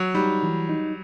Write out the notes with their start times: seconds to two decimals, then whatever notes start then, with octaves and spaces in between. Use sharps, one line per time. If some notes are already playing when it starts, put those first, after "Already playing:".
Already playing: F#3
0.15 G3 D#4
0.42 E3
0.69 D#4